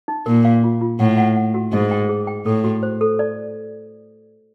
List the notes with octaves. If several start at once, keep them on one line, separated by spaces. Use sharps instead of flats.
D#4
A#2 A#4
F5
F4
F4
A2 F#5
F#5
F#5
F#4
G#2 D#5
G5
G#4
G5
A2 A4
F#4
C5
A4
D5